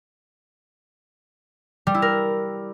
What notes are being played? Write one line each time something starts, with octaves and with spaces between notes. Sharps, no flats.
G3
E4
A#4